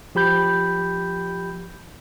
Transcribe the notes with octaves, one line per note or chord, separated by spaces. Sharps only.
F3 G4 B5 G6